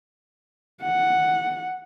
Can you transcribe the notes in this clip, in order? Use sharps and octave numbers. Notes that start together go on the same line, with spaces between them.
F#5